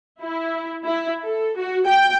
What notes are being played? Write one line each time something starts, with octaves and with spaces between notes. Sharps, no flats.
E4
E4
A4
F#4
G5